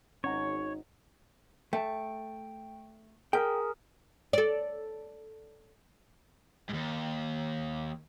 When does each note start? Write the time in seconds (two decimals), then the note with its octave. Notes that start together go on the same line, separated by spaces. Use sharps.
0.24 G#1 C#4 D#4 C#5 F#5 A#5
1.73 A3 G5
3.33 G#4 A#4 G5
4.33 A4 D5
6.69 D#2 G#2